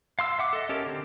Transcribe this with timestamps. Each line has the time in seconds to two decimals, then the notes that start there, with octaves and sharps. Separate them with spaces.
0.19 F5 C6 E6
0.39 E5 F#5 D6
0.53 A4 D#5
0.69 C#4 G4 A4 A#4
0.86 D3 C4